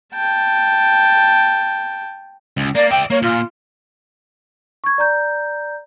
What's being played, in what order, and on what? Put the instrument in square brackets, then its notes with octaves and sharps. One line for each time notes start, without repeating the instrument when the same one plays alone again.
[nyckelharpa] G5 A5
[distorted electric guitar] C#2
[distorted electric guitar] A#3 [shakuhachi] D5
[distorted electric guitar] D5 E5 [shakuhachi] G5
[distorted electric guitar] A#3 [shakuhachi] C#5
[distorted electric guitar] A#2 [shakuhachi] F4
[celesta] C#6 G#6
D5 A#5 G6